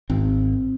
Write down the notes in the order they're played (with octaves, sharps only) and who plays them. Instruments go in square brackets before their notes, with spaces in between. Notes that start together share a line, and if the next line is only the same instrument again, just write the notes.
[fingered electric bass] G#1 C4